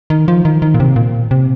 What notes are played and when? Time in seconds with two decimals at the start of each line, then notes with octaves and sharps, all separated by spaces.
0.10 D#3
0.28 F3
0.45 D#3
0.62 D#3
0.74 A#2
0.80 C3
0.96 A#2
1.31 C3